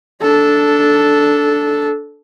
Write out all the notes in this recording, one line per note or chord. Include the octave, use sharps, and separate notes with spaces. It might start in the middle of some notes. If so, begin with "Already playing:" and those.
D4 A4